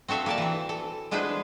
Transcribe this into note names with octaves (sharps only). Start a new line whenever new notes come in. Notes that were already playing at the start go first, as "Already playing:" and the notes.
C4 F#4 A4 E5 F5
A#3 D5 A5
E3 C4
A4
G#3 B3 D4 E4 B4 C5